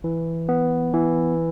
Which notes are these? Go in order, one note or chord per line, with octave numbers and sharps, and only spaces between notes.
E3
B3
E3